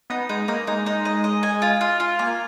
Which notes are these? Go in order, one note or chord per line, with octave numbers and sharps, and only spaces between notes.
B3 D#4
G#3 D#4
A#3 D#4
G#3 D#4
D#4
D#5
D#5
G#5
F4
F4
F4
A#3 G#5